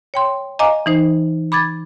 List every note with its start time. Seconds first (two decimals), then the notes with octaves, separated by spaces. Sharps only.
0.14 C#5 G5 C6
0.59 D#5 F5 G#5 A#5 D6
0.86 E3 D#4 C5
1.52 B5 D6 G#6 A6